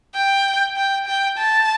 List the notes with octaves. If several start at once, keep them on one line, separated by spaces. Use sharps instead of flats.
G5
G5
G5
A5